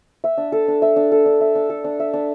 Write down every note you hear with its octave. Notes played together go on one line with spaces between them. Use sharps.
E5
D4
A4
D4
E5
D4
A4
D4
E5
D4
A4
D4
E5
D4